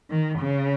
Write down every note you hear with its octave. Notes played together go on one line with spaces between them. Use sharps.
D#3
C#3